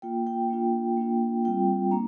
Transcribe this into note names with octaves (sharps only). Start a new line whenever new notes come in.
A#3 F4 G5
G5
A#3 D4 F4
A#3 D4 F4
G3 C4 F4 G5
A#3 D4 A#5